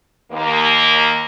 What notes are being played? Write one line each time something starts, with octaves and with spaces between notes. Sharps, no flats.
D#2 A#3